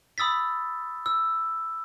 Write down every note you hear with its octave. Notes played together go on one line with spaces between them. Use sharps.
B5 D#6 E6 A6 B6
E6